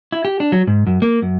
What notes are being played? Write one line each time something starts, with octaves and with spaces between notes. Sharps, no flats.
E4
G4
D4
F#3
G#2
F#2
A#3
F#2